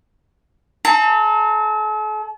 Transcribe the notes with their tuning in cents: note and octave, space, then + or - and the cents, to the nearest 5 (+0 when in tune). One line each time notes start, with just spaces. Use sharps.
A4 -45 A5 +45